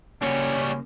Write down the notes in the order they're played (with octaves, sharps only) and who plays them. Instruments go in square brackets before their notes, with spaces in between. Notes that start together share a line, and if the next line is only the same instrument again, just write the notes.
[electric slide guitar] C#3 A#3 [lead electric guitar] G3 C#5 [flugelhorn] C#4